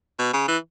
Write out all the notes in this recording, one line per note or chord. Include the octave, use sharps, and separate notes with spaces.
B2
C#3
E3